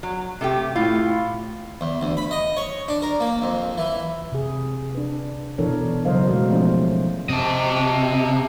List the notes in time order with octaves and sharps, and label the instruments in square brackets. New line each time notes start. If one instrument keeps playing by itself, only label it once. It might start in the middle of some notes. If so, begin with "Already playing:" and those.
[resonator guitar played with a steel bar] F#3
C3 A3 G4
[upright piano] A2 [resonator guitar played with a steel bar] F4
[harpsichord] E2
D2
B5
D#5
C#5
D4
A#4
A#3
F2
E3
[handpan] C3 G#4
D4 B4
B2 E3 D4 A4 A#4 C#5
C#3 F#3 A#4 C5 D#5 F5
B2 G#3 A3 F#4 A#4 D5
F3 A3 C#4 D#4 C5
[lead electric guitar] C3 [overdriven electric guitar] D#5 A5